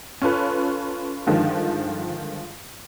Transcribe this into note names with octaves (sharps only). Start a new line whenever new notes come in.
C#4 F4 A4 B4
G2 D3 D#3 F3 G#3